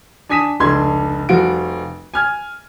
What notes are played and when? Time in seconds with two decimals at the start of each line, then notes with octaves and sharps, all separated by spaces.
0.29 D4 G#5 D#6 B6 D#7 E7
0.60 F1 C#2 D4 A4 C6 G#6
1.29 F1 F3 G3 F4 F#4 D7
2.14 G#5 F6 G#6